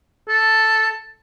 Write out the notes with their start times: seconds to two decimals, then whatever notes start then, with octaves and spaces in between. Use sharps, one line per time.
0.28 A4